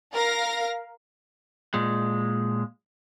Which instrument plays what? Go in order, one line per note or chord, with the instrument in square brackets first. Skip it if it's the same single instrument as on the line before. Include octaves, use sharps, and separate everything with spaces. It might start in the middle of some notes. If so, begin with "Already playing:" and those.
[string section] A#4 F5 A#6
[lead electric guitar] A#2 G#3